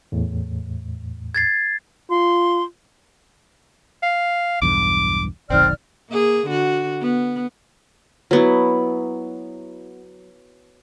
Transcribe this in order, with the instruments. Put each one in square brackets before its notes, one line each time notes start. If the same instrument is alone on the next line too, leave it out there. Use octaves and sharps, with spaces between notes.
[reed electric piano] E2 A2
[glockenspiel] G#6 A6 C7
[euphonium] F4 [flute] C6
[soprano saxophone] F5
[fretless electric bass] B1 E2 G2 [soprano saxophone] D6
[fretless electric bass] F1 B1 D#3 [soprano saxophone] C4 [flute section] D5 F6
[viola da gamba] A#3 G#4
D3 F#4
B3
[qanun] F#3 B3 E4